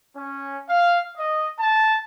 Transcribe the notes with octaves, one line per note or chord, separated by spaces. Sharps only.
C#4
F5
D#5
A5